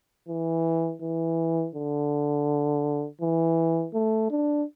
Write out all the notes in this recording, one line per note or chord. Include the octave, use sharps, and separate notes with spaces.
E3
E3
D3
E3
A3
D4